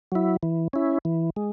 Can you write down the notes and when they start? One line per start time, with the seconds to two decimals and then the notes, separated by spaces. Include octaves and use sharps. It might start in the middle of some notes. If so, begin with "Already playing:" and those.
0.12 F#3 E4
0.43 E3
0.73 C#4 E4
1.05 E3
1.36 G#3